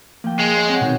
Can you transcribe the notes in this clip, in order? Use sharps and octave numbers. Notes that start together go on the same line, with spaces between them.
F3 A#3 G5
G#3
C#5 C#7 E7
C4 C#5 F#5 G#5
B2 D#3 C4